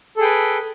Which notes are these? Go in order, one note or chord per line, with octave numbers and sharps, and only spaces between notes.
G#4 A4 B4 G5